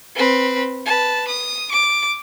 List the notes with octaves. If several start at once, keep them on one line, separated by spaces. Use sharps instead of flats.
C4 B4
B4 A5
D#6
D6